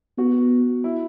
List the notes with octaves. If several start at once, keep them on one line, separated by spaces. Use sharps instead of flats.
B3 F#4
E4